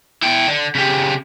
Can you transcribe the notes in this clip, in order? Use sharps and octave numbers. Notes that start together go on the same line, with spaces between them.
E4 G5
D3
C#3 G4